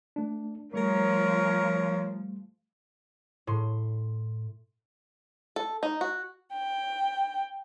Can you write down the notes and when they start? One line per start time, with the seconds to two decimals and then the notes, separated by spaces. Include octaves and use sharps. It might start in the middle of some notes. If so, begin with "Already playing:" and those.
0.16 A3 D4
0.74 F3 G3 A3 A#4 C#5
3.47 A2 C6
5.56 A4
5.83 D#4
6.01 F#4
6.53 G5